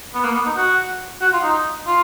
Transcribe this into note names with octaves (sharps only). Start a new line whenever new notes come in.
B3
A#3
B3
D#4
F#4
F#4
F4
D#4
F4